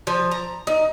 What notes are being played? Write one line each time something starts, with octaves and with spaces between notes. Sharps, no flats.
F3
A#5
D#4